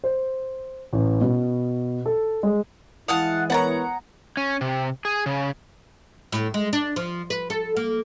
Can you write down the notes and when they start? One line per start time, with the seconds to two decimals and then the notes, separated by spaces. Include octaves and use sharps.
0.04 C5
0.93 A1
1.21 B2
2.06 A4
2.43 G#3
3.08 E3 G#3 E4 F5 F#5 A5 D#6
3.50 B3 A#4 C#5 F#5 A5 A#5
4.37 C#4
4.61 C3
5.05 G#4
5.26 C#3
6.32 A2
6.54 G#3
6.73 D4
6.96 F3
7.30 B4
7.50 A4
7.77 A#3